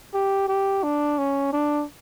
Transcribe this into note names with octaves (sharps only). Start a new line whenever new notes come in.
G4
G4
D4
C#4
D4